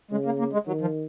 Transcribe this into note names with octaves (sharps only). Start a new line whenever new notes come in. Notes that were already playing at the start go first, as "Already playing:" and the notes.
C#3 G#3
A#3
A#3
G#3
D#3 F#3
F3